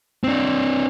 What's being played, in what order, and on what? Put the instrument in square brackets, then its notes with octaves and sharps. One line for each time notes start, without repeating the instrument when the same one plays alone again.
[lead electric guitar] C4 D4